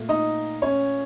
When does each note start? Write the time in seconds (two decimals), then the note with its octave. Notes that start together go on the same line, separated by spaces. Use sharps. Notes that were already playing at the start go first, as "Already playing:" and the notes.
Already playing: A#2 A3
0.09 D#4 D#5
0.62 C#4 C#5